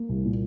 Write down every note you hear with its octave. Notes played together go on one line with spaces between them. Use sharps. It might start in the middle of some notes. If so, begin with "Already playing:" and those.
Already playing: A#3
C2
A#2